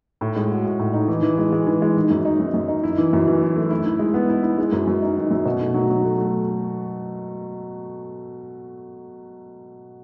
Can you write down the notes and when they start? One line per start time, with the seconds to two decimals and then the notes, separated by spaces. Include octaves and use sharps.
0.21 A2
0.36 G#3
0.50 F#4
0.65 A2
0.79 A2
0.93 D#4
1.08 E3
1.23 E3
1.38 G#3
1.53 G#3
1.67 E3
1.82 G#3
1.96 D#3
2.10 F#2
2.25 D#4
2.40 F#2
2.54 F#2
2.68 D#4
2.83 E4
2.98 E3
3.13 F#2
3.28 E3
3.41 E4
3.56 A3
3.71 E4
3.86 E4
3.99 G#3
4.14 B3
4.29 E4
4.43 E4
4.58 G#3
4.72 F#2
4.87 F#2
5.02 D#4
5.16 D#3
5.31 F#2
5.45 B2
5.61 A3
5.74 F#3
5.90 F#3
6.04 A3
6.18 A3